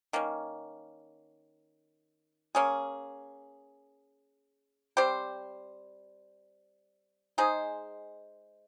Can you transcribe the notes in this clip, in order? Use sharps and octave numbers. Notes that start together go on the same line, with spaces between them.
D#3 A#3 C#4
A#3 C#4 G#4
G3 C4 G4 C5
G#3 D#4 G#4 C5